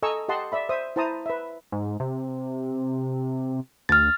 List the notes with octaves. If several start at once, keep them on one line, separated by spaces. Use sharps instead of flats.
A4 D#5 G#5 A#5 C#6 E6
G4 D#5 F#5 A5 C6
D5 E5 B5
C5 E5 D#6
E4 C5 A5 A#5 D#6
B4 E5
G#2
C3
D2 F6 A6